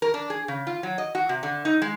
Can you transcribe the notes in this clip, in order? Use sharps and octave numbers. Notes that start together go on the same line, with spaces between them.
A#4
D4
G#4
C#3
F4
F#3
D#5
F#4
C3
D3
D#4
G#3